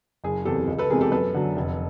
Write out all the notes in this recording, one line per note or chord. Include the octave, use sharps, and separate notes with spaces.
F#1 G#4
E2 C3 G4 A4
C#2
A4 B4
C3 E3 G#3 B3 G#4 A#4
G4 A4
F#2 A4 B4
D3 F#3
F1